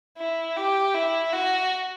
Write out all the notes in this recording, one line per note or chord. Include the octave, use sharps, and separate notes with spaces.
E4
G4
E4
F#4